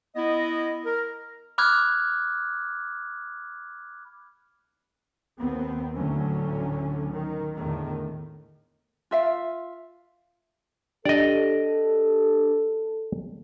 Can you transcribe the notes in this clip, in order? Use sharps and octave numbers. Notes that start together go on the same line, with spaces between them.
B3 E4 D#5
A#4
B5 D6 F6 F#6 G#6
D#2 B3 C4
D2 A2 D3 F#3 C#4
D#3
E2 A2 D3 D#3 A3
F4 E5 F5
D4 G4 A4 D5 D#5